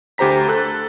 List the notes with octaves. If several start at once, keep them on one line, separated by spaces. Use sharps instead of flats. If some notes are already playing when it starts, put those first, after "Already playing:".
D2 G4 C5 A#5 B6
A4 F#6